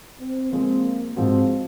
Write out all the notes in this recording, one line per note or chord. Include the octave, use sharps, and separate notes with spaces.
C4
F3 G#3 A#3 C4
G#2 F3 G#3 C4 F#4